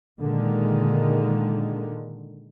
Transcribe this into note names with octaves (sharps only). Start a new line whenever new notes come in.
A#2 D3 D#3 G#3